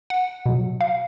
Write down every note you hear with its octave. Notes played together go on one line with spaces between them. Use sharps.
F#5
B2 F#3
F5